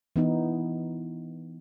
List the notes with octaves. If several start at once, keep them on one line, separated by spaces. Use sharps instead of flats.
E3 B3 D#4